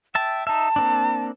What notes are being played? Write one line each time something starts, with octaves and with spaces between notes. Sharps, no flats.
E5 G5 A5
D#4 E5 A5
A#3 C4 D4